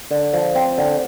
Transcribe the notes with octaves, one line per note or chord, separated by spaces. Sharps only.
D3
F3
C4
D3